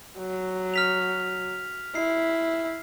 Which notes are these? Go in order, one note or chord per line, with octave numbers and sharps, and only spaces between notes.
F#3
F6 B6 F7
E4 C7